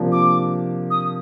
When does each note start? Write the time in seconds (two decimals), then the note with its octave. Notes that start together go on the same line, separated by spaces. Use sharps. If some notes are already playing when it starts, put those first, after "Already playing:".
Already playing: C3 F3 A#3 D4
0.12 D6
0.91 D#6